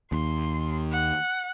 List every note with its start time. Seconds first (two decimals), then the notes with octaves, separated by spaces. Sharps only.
0.12 D#2 C6
0.92 F#5